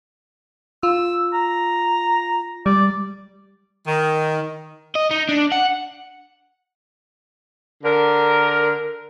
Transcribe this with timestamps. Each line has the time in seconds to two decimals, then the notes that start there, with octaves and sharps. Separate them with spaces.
0.83 F4 E6
1.33 A#5
2.66 G3 D5
3.87 D#3
4.96 D#5
5.11 D#4
5.29 D4
5.52 F#5
7.84 D3 A#4